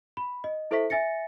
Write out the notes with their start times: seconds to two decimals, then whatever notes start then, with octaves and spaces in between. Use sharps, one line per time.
0.17 B5
0.44 D#5
0.71 E4 A4 C5 E5 C#6 B6
0.90 E5 G#5 A6 A#6 C#7